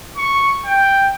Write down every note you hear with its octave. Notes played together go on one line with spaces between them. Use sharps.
C#6
G5